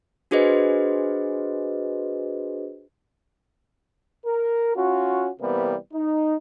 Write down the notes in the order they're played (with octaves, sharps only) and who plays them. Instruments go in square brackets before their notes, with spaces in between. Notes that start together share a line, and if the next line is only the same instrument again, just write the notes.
[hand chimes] D4 F#4 G#4 B4 C5 D#5
[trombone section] A#4
C#4 F4 F#4
C3 E3 G3 A#3 B3
D#4